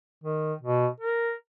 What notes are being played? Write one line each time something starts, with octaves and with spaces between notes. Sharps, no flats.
D#3
B2
A#4